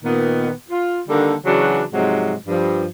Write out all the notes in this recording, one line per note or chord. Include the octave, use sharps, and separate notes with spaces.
A#2 D#3 B3
F4
D3 D#3 G3 A#3 D4 A4
C#3 E3 F#3 D4 F#4 G#4
G#2 C3 F3 F#3 G#3
G2 F3